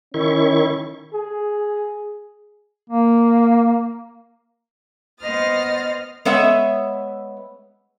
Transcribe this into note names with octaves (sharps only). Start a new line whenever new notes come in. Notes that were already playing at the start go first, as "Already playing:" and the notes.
D#3 C#4 E4 C#6
G#4
A#3
B3 C5 D#5 D#6 F6 A6
G#3 B3 C#5 E5 F#5